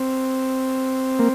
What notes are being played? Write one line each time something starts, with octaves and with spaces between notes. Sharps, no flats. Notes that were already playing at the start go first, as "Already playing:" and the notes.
Already playing: C4
A#3